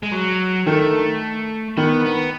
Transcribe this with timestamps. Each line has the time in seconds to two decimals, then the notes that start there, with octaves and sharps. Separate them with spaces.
0.03 G#3
0.12 F#3
0.66 D#3 A3
1.77 D#3 B3
2.06 B3